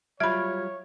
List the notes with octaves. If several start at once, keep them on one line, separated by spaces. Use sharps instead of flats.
F#3 G3 F4 C#5 E5 B5 F6 G#6